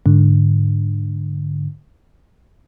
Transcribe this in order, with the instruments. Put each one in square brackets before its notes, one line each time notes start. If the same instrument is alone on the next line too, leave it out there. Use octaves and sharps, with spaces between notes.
[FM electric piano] G#2 D3